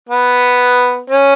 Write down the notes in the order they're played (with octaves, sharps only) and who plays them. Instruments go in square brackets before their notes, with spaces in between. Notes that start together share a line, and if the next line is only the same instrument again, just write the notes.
[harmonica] B3
C#4